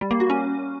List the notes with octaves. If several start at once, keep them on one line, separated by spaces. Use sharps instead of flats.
G3
A#3
F#4
C#4